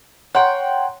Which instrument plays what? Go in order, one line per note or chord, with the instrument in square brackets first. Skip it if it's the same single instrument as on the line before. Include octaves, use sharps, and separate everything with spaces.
[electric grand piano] C#5 A#5 C6 [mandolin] F#5 G5